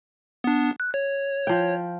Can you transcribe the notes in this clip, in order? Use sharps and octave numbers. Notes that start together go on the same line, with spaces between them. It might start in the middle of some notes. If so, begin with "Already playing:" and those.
B3 D4
F#6
C#5
F3 G5